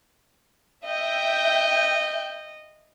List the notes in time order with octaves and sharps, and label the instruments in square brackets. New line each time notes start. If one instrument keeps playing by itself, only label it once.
[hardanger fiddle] D#5 [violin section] E5 G5 G6